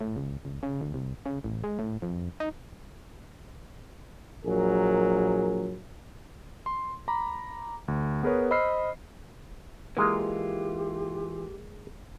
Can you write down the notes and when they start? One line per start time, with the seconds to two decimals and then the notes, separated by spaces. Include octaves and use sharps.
0.01 A2
0.17 C#2
0.45 C#2
0.63 C#3
0.81 D2
0.94 C2
1.26 C#3
1.44 A1
1.64 G#3
1.79 A2
2.02 F2
2.40 D#4
4.46 A#1 F#3 G#4 A#4
6.66 C6
7.08 A#5 B5 D6
7.88 D2
8.23 B3 G#4 A#4 B4 C#5
8.51 C5 D#5 B5 E6 F6 C7
9.97 E3 G#3 A#3 F4 G4